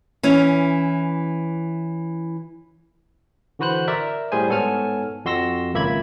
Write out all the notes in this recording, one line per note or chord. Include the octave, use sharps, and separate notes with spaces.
E3 C#4
D3 E3 F#4 B4 C5 F#6
A#4 D5 E5
A2 G3 G#4 C5 G#5
G#2 B3 A4 C#5 G#5 F6
F2 F#4 C6 E6 A#6
G#1 C#2 A#3 E5 B5 G#6